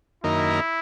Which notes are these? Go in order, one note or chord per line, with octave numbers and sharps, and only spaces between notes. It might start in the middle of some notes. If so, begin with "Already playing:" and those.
F#2 D#3 A#3 D#4 E4 A#4